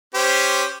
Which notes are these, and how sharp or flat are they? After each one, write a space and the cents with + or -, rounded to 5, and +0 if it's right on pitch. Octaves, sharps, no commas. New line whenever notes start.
C#4 +0 G4 +0 C5 -5